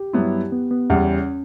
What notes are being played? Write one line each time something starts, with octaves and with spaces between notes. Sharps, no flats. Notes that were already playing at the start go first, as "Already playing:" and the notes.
Already playing: G4
G2 F#3 B3 E4
B3
B3
E2 C#3 G3 C#4